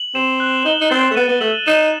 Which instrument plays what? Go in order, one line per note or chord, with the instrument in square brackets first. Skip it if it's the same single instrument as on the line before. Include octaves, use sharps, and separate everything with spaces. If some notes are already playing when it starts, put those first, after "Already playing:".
Already playing: [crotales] F#7
[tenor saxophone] C4 [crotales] E7
[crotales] F#6
[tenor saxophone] D#4 [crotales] G7
[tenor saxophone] D#4
[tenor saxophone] C4 [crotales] A6
[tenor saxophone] A3
[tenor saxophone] B3 [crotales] D#7
[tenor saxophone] B3
[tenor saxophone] A3 [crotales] F#7
[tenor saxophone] D#4 [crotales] E7